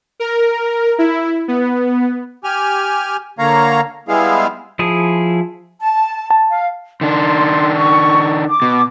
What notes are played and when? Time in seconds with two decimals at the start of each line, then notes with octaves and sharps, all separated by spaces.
0.20 A#4
0.98 E4
1.48 B3
2.44 G4 G#5 F6
3.39 D3 A#3 C#5 F5 A#5
4.08 G3 G#3 B3 E4 G#4 F5
4.79 F3 E4 G#4 A5 D#6
5.80 A5
6.30 A5
6.50 F5
7.01 D#3 D4 C6
7.76 C#6
8.48 D6
8.62 B2